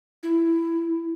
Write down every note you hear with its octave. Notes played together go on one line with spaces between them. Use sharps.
E4